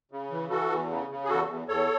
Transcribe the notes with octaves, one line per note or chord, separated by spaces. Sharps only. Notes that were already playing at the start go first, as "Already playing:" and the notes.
C#3
E3
E3 F#4 A4
E2
C#3
C#3
G#4
E2 F#4 A4
E2
E2 A4 C#5